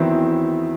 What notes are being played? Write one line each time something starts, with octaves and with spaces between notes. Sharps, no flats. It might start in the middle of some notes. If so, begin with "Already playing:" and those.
Already playing: E2 D#3 E3 F#3 C4 E4